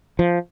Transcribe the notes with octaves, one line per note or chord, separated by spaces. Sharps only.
F3